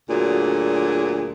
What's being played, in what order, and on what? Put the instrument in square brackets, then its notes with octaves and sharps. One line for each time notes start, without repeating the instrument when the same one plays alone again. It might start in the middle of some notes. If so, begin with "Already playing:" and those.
[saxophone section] D2 A#2 F#3 D4 F#4 G#4